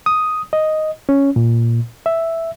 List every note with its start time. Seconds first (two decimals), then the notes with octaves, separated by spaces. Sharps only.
0.06 D#6
0.53 D#5
1.09 C#4
1.36 A#2
2.06 E5